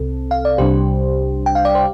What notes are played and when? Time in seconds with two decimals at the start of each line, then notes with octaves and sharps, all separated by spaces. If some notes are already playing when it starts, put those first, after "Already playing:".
Already playing: C2 C3 C4 A4
0.31 F5
0.45 D5
0.58 C2 C3 G3 D4 G4 C5
1.46 G5
1.55 F5
1.65 D5
1.75 C5